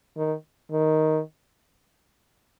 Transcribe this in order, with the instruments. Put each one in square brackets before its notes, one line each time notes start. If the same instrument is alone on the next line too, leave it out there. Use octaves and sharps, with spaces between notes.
[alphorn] D#3
D#3